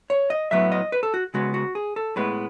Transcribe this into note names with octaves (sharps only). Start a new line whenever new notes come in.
C#5
D#5
A2 F#3 B3 E5
D#5
B4
A4
F#4
C#3 G#3 B3 F#4
F#4
G#4
A4
A2 G#3 B3 B4